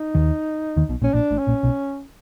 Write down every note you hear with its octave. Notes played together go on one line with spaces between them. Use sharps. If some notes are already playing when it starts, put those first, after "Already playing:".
Already playing: D#4
D#2 D#3
D#2 D#3
B1 B2
A#1 A#2 C#4
A#1 A#2 D4
A1 A2
C#4
A#1 A#2
B1 B2